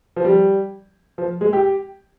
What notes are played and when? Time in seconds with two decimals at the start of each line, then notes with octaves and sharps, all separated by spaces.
0.16 F3
0.25 G3
1.18 F3
1.41 G#3
1.53 G4